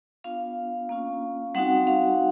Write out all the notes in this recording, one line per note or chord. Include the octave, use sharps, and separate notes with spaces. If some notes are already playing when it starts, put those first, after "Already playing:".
B3 D4 F4 F5
A#3 C#4 F4
G3 C4 D#4 F#4 F#5
F5